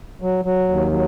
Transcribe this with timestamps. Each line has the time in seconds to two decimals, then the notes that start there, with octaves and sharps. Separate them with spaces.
0.22 F#3
0.45 F#3
0.69 D#2
0.91 F#3